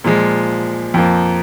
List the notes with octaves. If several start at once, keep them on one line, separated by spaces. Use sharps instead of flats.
A#2 F3 G#3
F2 F3 A#3